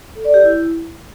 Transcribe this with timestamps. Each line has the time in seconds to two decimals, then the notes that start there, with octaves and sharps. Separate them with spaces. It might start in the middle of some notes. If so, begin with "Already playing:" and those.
0.15 A4
0.25 D5
0.34 G4
0.43 E4